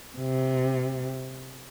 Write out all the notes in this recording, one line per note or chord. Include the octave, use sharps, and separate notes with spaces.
C3